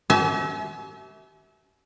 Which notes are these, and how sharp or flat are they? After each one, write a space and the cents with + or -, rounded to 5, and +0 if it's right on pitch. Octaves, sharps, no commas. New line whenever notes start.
G4 -40 E5 -20 G#5 +45